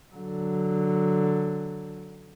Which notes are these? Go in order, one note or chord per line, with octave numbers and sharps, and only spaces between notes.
D3 F#3